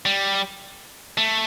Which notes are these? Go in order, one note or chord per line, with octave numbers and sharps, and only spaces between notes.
G3
A3